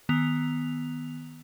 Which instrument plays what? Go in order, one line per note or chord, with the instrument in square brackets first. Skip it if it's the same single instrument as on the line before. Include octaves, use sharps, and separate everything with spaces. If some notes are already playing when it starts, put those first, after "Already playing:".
[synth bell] D#3 B3 F7